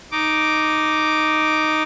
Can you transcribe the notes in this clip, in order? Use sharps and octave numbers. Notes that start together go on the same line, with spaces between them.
D#4 D6